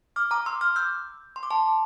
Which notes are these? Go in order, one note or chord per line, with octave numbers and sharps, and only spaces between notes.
D6 F6
A#5 D6
C6 E6
D6 F6
E6 G6
C6
D6
A5 C6